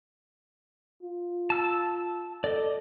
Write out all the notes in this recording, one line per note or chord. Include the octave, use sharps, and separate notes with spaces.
F4
A5 E6
A4 D5 D#5